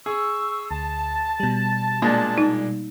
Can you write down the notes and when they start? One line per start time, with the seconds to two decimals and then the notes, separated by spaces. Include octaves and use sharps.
0.06 G#4 C#6 E6
0.71 D2 A5
1.40 B2 G3
2.02 A#2 G#3 A#3 D4
2.38 D#4